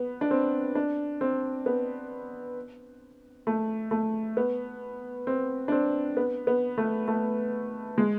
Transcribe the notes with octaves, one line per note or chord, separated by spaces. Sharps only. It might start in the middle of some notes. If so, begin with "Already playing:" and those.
Already playing: B3
D4
C4
D4
C4
B3
A3
A3
B3
C4
D4
C4
B3
B3
A3
A3
G#3